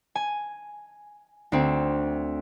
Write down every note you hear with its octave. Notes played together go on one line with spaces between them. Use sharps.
G#5
D2 C4